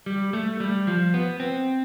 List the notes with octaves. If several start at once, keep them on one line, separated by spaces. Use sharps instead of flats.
G3
A3
G3
F3
B3
C4